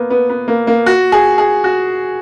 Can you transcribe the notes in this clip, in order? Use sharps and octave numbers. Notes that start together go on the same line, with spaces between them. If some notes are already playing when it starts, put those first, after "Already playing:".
Already playing: A#3 B3
B3
B3
A#3
A#3
F#4
G#4
G#4
F#4